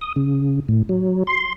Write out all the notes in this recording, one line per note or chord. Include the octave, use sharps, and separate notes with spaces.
D#6
C#3
A2
F#3
C6